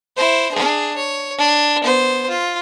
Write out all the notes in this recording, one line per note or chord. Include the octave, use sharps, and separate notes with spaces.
E4 C5
D4 G#4
C#5
D4
B3 C5
F4